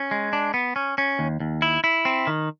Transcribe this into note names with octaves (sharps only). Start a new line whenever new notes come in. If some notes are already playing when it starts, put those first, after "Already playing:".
Already playing: C#4
G#3
D4
B3
C#4
C#4
D#2
D#2
E4
E4
C4
D#3